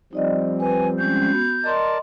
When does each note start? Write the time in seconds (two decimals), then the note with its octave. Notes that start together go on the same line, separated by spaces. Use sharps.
0.13 F3 G3 C4 D#4 D5 D#5
0.60 B4 G#5
0.99 G#3 C#4 G6
1.31 B3 F#4
1.64 A#4 D5 D#5 A5 C6